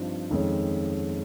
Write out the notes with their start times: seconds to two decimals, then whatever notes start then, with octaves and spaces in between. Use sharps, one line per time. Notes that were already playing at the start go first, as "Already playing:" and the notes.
Already playing: G2 F3 C4 D#4
0.31 F2 D#3 G#3 C#4